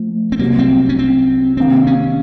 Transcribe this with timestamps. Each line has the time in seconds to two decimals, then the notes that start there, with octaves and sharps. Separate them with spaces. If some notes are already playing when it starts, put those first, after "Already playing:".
Already playing: F3 A3
0.32 C4
0.39 C2 C3 F#3 A#3
0.59 C4
0.89 C#4
0.99 C4
1.57 C3 D#3 A#3 C4
1.87 C#4